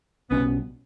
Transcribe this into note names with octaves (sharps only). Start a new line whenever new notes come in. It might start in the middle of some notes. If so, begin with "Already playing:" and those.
B1 B2 G3 B3 C#4